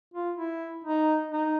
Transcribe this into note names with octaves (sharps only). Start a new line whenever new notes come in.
F4
E4
D#4
D#4